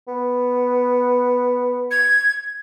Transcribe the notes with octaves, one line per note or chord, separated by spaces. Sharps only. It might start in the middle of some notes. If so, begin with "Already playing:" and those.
B3
G#6